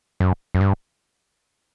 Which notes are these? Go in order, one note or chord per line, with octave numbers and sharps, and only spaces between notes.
F#2
F#2
G2